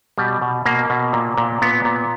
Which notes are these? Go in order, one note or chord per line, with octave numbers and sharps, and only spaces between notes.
B2 G3
B2
B2 A#3
B2
A#2
A#2
A#2 B3
A#2